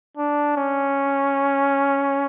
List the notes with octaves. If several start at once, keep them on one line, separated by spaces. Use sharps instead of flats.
D4
C#4